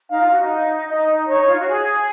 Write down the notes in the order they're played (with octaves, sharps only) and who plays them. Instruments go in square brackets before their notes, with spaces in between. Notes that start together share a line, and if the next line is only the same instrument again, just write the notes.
[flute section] D#4 [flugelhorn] F5
[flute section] F4
F#4
D#4
[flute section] D#4 [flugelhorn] D#5
[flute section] D#4 [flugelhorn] C#5
[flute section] D#4
F4
F#4
G#4